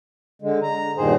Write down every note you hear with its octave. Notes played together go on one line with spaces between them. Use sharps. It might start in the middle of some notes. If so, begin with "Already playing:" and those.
D3 G#3
A#5
E2 G2 A#2 D#3 G#4 C5